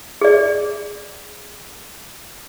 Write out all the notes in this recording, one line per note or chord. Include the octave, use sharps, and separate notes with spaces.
G#4 D5